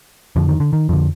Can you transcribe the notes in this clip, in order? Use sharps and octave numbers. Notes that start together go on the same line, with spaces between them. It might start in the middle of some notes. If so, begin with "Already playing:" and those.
F2 D3 F3
D#3
D3
D#3
F2 D3 F3